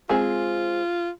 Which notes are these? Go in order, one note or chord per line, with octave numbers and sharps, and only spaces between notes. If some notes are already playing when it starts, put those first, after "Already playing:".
G#3 C4 F4 G#4